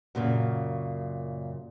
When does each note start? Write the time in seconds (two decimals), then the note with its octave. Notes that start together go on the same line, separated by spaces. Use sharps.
0.15 F#2 A#2 C#3